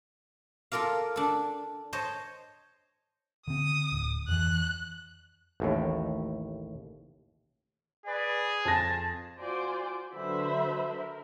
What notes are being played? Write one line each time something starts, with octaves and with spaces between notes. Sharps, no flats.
F4 A4 A#4 D5 F5
D4 A4
C5 C#5 D#5 A5
D3 C4 D#6
D1
F2 E3 F#6
A1 D#2 A2
G#4 B4 D5
F2 G#5 A5 A#6
F4 F#4 C5 D5 G#5 C6
D3 F#3 B4 C5 E5 B5
A#4